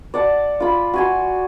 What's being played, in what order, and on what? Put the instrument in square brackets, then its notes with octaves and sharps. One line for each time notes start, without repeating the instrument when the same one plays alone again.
[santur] D5 F#5 A5
F4 B5
F#4 G#5 C6